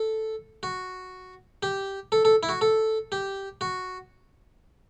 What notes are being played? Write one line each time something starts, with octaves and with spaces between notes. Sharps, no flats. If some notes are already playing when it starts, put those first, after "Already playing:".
Already playing: A4
F#4
G4
A4
A4
E4
F#4
A4
G4
F#4